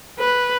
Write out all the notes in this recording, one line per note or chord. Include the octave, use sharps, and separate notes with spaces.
B4